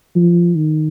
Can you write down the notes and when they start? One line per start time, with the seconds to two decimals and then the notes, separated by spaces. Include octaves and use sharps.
0.16 F3
0.56 D#3